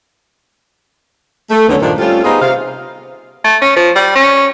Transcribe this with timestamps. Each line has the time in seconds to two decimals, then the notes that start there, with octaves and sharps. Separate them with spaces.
1.51 A3
1.69 D#2 D3 D#3 F#3 B3 C#4
1.81 G2 A#2 D#3 F3 A3 D4
1.99 G3 A3 C4 C#4 F4
2.25 B3 D#4 F4 G4 G#4 C5
2.41 C3 F5
3.44 A3
3.62 C#4
3.76 F3
3.96 G3
4.15 C#4